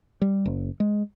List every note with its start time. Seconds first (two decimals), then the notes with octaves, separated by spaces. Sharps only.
0.22 G3
0.46 F#1
0.80 G#3